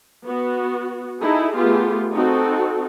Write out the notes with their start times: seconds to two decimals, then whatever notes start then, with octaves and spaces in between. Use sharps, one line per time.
0.27 B3 F#4
1.22 D#4 E4 G#4 A4
1.55 A3 B3 F4 G4 G#4
2.12 C4 D#4 F#4 A4